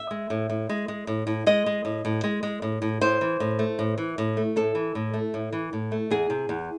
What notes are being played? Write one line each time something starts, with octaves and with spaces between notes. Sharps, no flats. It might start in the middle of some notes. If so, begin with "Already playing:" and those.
Already playing: E5
G#3
A2
A2
G#3
G#3
A2
A2
G#3 D#5
G#3
A2
A2
G#3
G#3
A2
A2
A2 C5
E3
A2
A3
A2
E3
A2
A3
A2 A4
E3
A2
A3
A2
E3
A2
A3
E2 G#4
C3
E2